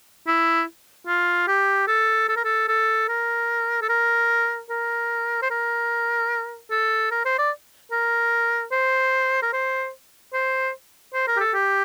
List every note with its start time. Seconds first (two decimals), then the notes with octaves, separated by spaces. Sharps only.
0.27 E4
1.07 F4
1.48 G4
1.87 A4
2.29 A4
2.36 A#4
2.44 A4
2.68 A4
3.09 A#4
3.82 A4
3.89 A#4
4.70 A#4
5.42 C5
5.50 A#4
6.71 A4
7.11 A#4
7.25 C5
7.38 D5
7.92 A#4
8.72 C5
9.42 A#4
9.53 C5
10.33 C5
11.14 C5
11.27 A#4
11.37 G4
11.40 A4
11.54 G4